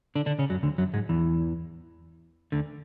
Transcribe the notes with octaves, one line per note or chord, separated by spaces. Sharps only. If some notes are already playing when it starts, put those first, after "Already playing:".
D3 D4
D3 D4
C#3 C#4
F#2 F#3
D2 D3
F#2 F#3
G#2 G#3
E2 E3
D2 D3